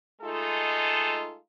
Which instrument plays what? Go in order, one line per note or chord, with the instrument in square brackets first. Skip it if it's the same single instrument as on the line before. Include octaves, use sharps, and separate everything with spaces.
[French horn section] G#3 A3 D#4 F4 A4